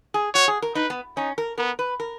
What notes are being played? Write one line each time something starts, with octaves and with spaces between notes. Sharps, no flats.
G#4
F#4 C#5
G#4
A#4
D#4 B4
B3
C#4 D#4
A#4
B3 A#4
B4
A#4